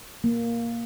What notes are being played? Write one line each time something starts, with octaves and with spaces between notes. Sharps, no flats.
A#3